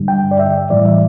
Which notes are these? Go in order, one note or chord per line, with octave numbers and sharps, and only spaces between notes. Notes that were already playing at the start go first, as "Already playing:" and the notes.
Already playing: G2 D3 G3
G5
D5
E5
A2 E3 G3 D5
E5